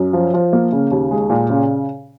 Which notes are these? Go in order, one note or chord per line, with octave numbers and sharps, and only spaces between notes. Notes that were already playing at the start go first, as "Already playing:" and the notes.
Already playing: F#2
F3
F3
A#3
C#3
D#2
G#3
A#2
C#3